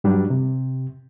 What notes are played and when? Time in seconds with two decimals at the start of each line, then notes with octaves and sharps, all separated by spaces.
0.04 G2 F#3 G3 D4
0.30 C3